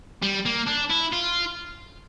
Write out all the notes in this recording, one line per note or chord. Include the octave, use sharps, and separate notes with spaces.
G3
A#3
D4
E4
F4